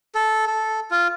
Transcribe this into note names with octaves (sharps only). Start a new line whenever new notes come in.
A4
A4
F4